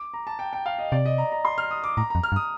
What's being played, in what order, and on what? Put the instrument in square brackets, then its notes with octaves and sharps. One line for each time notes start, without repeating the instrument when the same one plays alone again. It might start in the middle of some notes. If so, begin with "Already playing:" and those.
Already playing: [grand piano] D6
A#5
A5
G5
G5
F5
D#5
[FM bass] C3 [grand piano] D5
[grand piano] D#5
A#5
A#5
C6
F6
D#6
D6
[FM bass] A2 [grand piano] A#5
[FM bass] F2 [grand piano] A#5
[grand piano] F6
[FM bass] G2
[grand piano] D#6